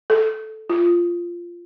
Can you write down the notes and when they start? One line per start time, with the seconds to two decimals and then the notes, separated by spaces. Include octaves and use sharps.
0.10 A4
0.69 F4